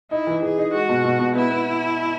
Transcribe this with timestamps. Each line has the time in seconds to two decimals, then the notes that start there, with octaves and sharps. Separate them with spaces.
0.11 D#4 E4
0.27 E3
0.42 E3 G#4
0.58 D#4
0.73 G#3 F#4
0.89 B2
1.04 B2
1.19 B2
1.35 B3 E4
1.50 B3